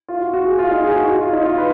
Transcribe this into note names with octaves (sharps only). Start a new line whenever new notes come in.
F4
F#4
F#4
G#4
F4
D#4
G#4
F#4
F#4
F4
D#4
F4
B4